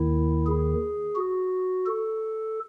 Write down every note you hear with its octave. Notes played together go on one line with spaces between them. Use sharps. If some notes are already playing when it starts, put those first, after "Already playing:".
Already playing: D#2 D#3 E4
G#4
F#4
A4